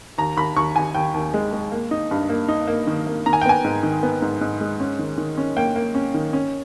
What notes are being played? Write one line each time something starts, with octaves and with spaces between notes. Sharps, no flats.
D#2 A#5
D#2 B5
D#2 C#6
D#2 G#5
D#2 G5
D#2
G#3
G#3
A#3
D#4
G2
A#3
D#4
A#3
D#3
A#3
D#3 A#5
G#5
G5
B3 G#5
G#2
D#3
B3
G#2
G#2
G#3
C#4
D#3
D#3
C#4
A#3 G5
A#3
C#4
D#3
C#4